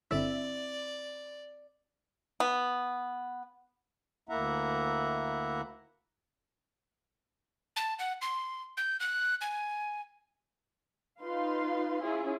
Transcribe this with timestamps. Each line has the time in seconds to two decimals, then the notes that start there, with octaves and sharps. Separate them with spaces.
0.11 G1 D3 C4 E4 D5 E5
2.40 B3
4.29 D2 A#3 E4 E5 F#5 A#5
7.76 A5
7.99 F#5
8.22 C6
8.77 G6
9.00 F#6
9.41 G#5
11.21 D#4 F4 B4 F5 C6
12.03 C#4 E4 F4 G#4